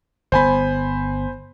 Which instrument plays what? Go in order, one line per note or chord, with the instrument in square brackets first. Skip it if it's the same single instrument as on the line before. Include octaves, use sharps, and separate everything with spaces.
[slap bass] G1 B3 [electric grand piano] C5 G#5 B5